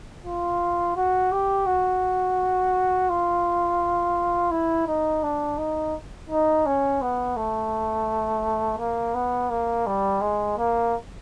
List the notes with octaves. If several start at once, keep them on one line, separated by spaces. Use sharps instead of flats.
F4
F#4
G4
F#4
F4
E4
D#4
D4
D#4
D#4
C#4
B3
A3
A#3
B3
A#3
G3
G#3
A#3